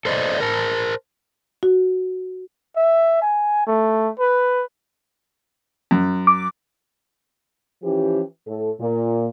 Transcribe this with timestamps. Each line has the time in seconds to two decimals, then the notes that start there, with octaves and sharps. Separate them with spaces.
0.05 A4 C5 D5 D#5
0.40 A#4 C5 A5
1.63 F#4
2.76 E5
3.21 G#5
3.67 A3
4.19 B4
5.91 F#2
6.27 D6
7.83 E3 F3 C#4 G4
8.47 A2 A4
8.80 A#2